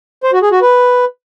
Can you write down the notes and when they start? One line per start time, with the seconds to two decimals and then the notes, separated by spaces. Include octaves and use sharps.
0.23 C5
0.33 F#4
0.43 G#4
0.52 F#4
0.62 B4